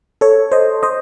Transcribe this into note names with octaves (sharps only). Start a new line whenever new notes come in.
A4 C#5
C5 D#5
C5 D#5